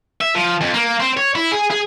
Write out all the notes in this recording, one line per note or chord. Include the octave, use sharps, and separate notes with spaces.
E5
F3
F2
A#3
C4
C#5
E4
G#4
G#4